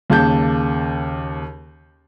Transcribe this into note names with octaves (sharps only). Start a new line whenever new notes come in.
D#2 C#3 A5 G6